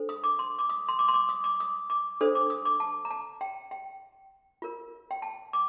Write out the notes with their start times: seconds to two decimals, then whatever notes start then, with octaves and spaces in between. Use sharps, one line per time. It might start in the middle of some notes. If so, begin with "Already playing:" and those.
Already playing: D4 A4 C5
0.09 D#6
0.24 D6
0.39 C6
0.59 D6
0.69 D#6
0.88 C6
0.99 D6
1.08 C6
1.14 D6
1.29 D#6
1.44 D6
1.60 D#6
1.90 D6
2.21 D4 A4 C5 D#6
2.35 D6
2.50 D#6
2.65 D6
2.80 A5
3.05 A#5
3.11 A5
3.41 G5
3.71 G5
4.62 F4 A#4
5.11 G5
5.22 A5
5.53 D6